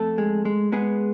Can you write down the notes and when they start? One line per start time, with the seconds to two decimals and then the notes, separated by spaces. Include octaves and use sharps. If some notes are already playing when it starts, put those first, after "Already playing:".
Already playing: F2 A3 A4
0.18 G#3
0.45 G#3
0.72 G#3 B3 G#4